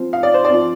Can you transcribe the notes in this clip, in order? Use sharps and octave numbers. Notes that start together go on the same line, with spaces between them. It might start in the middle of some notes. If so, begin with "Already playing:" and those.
Already playing: F3 C4
F5
D5
C5
D5
F3 C4